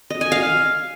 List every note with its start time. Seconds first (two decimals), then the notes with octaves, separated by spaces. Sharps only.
0.10 D#5
0.21 G#5
0.32 F5